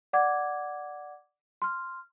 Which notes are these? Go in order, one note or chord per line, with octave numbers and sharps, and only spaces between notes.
D5 F#5 D6 G#6
C6 F6